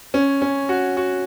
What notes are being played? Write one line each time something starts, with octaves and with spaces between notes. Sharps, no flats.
C#4
C#4
F#4
F#4